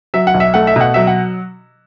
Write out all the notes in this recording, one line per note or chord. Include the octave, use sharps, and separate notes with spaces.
F#3 E5
F#5
B1
E5
A3 F#5
E5
B2 F#5
F#3 E5
F#5